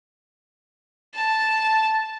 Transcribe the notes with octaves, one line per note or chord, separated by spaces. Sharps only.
A5